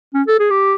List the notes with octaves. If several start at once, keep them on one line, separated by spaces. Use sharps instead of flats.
C#4
A4
G#4
G4